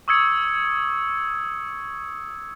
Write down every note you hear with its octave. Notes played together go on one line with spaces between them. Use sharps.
C#6 D#6 E6 G#6 C#7